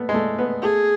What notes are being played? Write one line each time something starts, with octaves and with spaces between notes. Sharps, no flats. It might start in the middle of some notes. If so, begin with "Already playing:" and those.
Already playing: A3 B3
G#3
A3
B3
A3 G#4